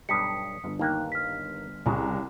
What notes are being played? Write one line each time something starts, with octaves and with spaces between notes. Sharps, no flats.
B1 G2 G3 D#6 B6 C#7
G1
D#2 A#3 D#4 G5 F#6
F6 B6
C2 C#3 G#4 A#5